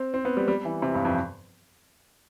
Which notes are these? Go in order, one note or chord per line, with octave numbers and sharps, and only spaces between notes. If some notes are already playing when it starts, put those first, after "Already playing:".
Already playing: C4
C4
B3
G3
G3
E3
C3
G2
F2